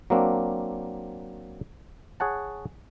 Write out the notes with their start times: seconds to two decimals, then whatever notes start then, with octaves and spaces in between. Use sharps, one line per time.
0.10 F#3 A#3 C4 D4
2.20 G#4 C#5 F#5 A5